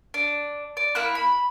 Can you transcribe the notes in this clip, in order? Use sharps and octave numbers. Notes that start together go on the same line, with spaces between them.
D4
D5
A#3 E4 F#6
B5